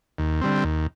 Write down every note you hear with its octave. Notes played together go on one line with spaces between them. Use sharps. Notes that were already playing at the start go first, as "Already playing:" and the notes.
D#2
D3 G3 C4
D#2